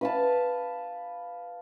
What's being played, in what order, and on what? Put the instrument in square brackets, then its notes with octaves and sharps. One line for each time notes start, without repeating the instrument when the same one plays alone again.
[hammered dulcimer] B4 F5 A5